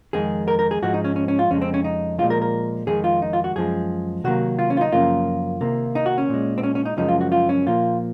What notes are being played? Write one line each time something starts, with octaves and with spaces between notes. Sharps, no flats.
F2 D#3 G#3 G#4
A#4
A#4
G#4
G#2 F3 G#3 F#4
D#4
C#4
C#4
C#4
F4
F2 C#3 G#3 C#4
C4
C#4
D#4
A#2 F3 G#3 F4
A#4
A#4
F2 D#3 G#3 G#4
F4
D#4
F4
F#4
F#2 F3 G#3 G#4
C3 D#3 F#3 A#3 F#4
F4
C#4
F4
D#4
F#2 C#3 F3 A#3 F4
C3 D#3 A#3
D#4
F#4
C#4
A#2 G#3
C4
C#4
C#4
D#4
F#2 C#3 F3 G#3 D#4
F4
F#4
F4
C#4
A#2 F3 A#3 F4